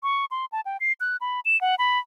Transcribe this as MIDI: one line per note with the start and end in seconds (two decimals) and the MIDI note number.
0.03 0.25 85
0.31 0.45 84
0.52 0.61 81
0.65 0.77 79
0.80 0.92 96
1.00 1.17 90
1.21 1.40 83
1.45 1.59 100
1.61 1.75 78
1.79 1.99 83